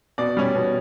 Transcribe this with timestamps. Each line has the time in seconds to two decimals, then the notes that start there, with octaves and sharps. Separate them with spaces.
0.18 B2 D5
0.37 G3 C#4
0.56 B2